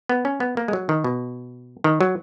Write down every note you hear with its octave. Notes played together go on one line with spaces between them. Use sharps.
B3
C#4
B3
A#3
G#3
F#3
D#3
B2
D#3
F#3